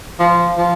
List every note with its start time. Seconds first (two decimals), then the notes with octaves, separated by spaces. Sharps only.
0.19 F3
0.57 F3